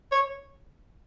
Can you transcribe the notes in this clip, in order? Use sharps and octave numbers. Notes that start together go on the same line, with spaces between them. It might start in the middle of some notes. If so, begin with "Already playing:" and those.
C#5